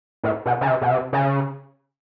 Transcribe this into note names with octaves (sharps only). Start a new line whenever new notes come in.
A2
B2
C#3
C3
B2
C3
C#3